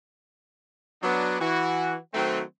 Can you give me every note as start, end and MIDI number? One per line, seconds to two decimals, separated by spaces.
1.02 1.36 54
1.02 1.36 59
1.02 1.36 62
1.40 1.95 52
1.40 1.95 66
2.13 2.41 51
2.13 2.41 54
2.13 2.41 57
2.13 2.41 60